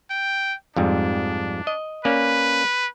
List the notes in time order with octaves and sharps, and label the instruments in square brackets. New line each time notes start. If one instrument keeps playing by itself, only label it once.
[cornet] G5
[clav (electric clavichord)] F2 G#2 G3 [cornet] D4
[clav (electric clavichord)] D#5
[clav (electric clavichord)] A#3 C#4 D5 [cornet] B4